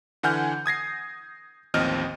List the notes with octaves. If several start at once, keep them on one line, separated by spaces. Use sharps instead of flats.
D3 E3 F#5 G#5 F6 G6
D#6 G#6 A#6 C7
A1 D#2 F3 C4 D#5 F6